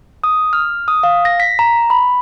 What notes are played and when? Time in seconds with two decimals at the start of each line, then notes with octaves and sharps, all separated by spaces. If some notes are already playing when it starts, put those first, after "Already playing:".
0.24 D#6
0.53 F6
0.88 D#6
1.03 F5
1.25 A#6
1.40 B6
1.59 A#5
1.90 B5